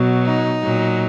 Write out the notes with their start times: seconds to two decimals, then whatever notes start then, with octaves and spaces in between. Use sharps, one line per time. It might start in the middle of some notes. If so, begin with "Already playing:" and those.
Already playing: B2 F#3
0.24 D#4
0.62 A#2 F#3